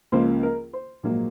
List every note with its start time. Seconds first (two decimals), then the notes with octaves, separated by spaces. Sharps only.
0.12 C#2 C#3 F3 A#3 C5
0.43 A#4
0.73 C5
1.03 A#1 G#2 F#3 A#3